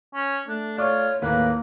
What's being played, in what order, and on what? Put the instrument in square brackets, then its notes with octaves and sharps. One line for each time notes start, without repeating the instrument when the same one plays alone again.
[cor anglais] C#4
[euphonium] A3 [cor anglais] D4
[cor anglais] F4 [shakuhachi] C#5 [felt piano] D5 C#6 D6
[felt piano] D#2 [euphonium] A2 [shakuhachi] A#3 [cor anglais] B4